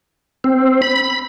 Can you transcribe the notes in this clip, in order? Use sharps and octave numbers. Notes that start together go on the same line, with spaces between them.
C4
B5